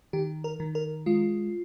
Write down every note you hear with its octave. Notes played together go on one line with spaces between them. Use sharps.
D#3 G4
A#4
D#3
A#4
G#3 F4